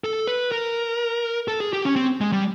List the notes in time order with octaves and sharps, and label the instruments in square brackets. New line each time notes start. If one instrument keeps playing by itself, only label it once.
[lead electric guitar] A4
B4
A#4
A4
G#4
G4
C#4
C4
G#3
G3